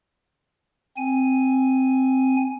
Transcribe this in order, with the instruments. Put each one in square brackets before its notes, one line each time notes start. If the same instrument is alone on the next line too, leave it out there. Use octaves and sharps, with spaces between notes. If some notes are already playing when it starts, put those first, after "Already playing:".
[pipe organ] C4 G#5